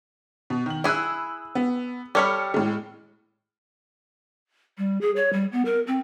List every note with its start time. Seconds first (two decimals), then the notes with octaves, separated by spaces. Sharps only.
0.50 B2
0.66 D#3 F#7
0.84 E4 G#4 B5 E6 F#6
1.55 B3
2.15 G3 A4 C#5 B5 F6 C#7
2.54 A2 G#3
4.78 G3
5.01 G#4
5.16 C#5
5.33 G3
5.52 B3
5.65 A#4
5.87 C4